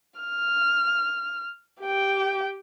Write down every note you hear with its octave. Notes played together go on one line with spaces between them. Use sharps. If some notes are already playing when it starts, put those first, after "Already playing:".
F6
G4 G5